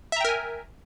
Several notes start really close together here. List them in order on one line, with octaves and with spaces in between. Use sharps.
E5 A#5 G5 A#4 G#5